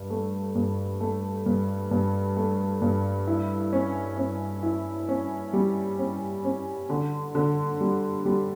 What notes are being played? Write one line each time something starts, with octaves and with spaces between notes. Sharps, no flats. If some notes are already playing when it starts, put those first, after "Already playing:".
Already playing: G2
A3
G2
A3
G2
G2
A3
G2
E4
C#4
C#4
E4
C#4
G3
C#4
C#4
D3
D3
G3
G3